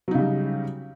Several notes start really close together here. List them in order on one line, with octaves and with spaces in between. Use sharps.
F#3 D#4 C#3 G3